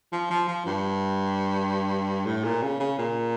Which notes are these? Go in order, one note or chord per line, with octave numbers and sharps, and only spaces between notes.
F3
F3
F3
G2
A2
A#2
C#3
C#3
A#2